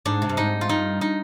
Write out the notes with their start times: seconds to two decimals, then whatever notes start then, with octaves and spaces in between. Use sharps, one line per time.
0.05 G#2 D4
0.22 C3
0.29 G2
0.37 G#2 D#4
0.61 F4
0.69 G2 D#4
1.01 D#4